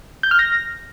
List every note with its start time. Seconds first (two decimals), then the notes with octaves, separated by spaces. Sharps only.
0.23 G6
0.31 F6
0.39 A#6